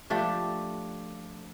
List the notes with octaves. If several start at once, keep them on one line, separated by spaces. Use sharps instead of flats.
F3 A3 D4 G4